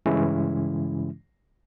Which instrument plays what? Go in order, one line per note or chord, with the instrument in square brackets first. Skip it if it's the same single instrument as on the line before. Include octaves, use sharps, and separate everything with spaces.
[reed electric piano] G2 C#3 E3 G#3 C#4 E4